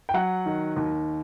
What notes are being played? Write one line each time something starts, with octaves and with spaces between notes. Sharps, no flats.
G5
F#3 F#5
D#3
D#2